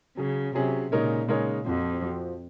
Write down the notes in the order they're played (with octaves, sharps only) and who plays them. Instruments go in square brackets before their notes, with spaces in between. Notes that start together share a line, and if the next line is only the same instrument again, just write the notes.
[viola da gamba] C#3 [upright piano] F#3 C#4 G#4
[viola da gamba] C3 [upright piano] F#3 C#4 G#4
[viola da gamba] A#2 [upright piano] C#3 G#3 D#4 A#4 C#5
[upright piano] C#3 G#3 D#4 A#4 C#5
[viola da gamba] F2 [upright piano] F3 C4 F#4
[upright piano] F3 C4 F#4